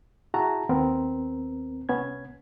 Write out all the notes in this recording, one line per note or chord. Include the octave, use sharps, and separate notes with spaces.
E4 F#4 G#4 A5 A#5
D#2 B3 C4 A#4
C2 B3 C#4 G#6